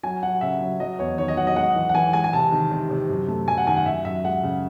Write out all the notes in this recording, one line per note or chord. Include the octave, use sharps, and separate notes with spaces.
F#3 G#5
F#3 F#5
C#3 E5
F#3
F#3 D#5
E2 C#5
D#3 C#5
D#5
F#3 F#5
D#5
G#3 F#5
E3
F#5
E3 G#5
G#3 G#5
G#5
C3 A5
D#3
C3
C3
F#2
A3
F#2 G#5
F#5
D#3 G#5
F#5
F#2 E5
F#2 E5
G#3 F#5
C#3